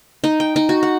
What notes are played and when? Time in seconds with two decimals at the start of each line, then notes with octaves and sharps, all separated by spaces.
0.24 D#4
0.40 G5
0.56 D#4
0.69 F#4
0.83 F#5